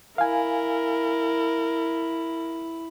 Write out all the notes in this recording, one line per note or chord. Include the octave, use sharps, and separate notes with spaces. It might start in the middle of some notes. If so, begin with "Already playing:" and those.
E4 A#4 F5 G#5